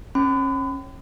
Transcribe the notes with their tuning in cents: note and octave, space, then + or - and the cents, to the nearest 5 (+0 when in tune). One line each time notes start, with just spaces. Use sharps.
C#4 -30 B5 +40